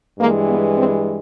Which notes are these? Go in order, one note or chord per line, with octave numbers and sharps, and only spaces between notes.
G2 E3 G#3 A#3
B3
C4